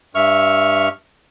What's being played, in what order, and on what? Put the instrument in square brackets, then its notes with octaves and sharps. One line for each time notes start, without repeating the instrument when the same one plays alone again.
[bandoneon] G2 C#6 F6 [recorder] E5